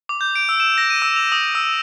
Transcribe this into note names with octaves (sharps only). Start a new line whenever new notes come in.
D6
G6
D7
E6
E7
A#6
D#7
E6
F7
D#6
E6